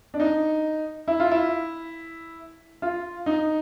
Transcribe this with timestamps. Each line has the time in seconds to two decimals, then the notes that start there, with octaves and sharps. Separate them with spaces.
0.14 D4
0.20 D#4
1.08 E4
1.20 F4
1.31 E4
2.82 F4
3.26 D#4